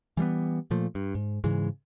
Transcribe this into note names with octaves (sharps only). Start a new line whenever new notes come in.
E3 G3 A#3 B3
A#2 F3 A3
G2
G#2
G#2 C#3 E3 G#3